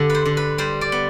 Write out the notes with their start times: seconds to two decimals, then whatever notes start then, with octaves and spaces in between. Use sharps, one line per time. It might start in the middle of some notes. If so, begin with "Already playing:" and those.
Already playing: D3 G4 A4
0.10 B4 C5
0.25 D3
0.37 B4
0.58 G3 C5
0.81 D5
0.92 B3